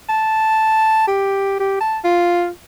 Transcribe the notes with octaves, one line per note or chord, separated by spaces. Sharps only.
A5
G4
G4
A5
F4